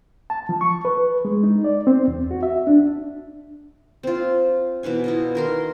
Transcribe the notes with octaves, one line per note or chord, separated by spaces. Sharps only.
A5
F3
C#6
B4
G#3
D#4
D5
C4
E2
F#4
E5
D4
C4 F4
B2 E3 B4 G#5
E4 F4 D#5
D#3 A#4 C6